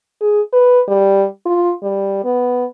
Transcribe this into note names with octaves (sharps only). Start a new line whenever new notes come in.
G#4
B4
G3
F4
G3
B3